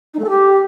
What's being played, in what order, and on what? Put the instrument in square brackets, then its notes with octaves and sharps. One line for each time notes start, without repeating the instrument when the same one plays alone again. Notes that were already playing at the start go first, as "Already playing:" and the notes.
[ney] D#4
A3
A4
G4